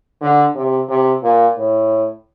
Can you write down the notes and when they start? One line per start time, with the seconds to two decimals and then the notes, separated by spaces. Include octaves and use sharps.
0.21 D3
0.55 C3
0.89 C3
1.23 A#2
1.57 A2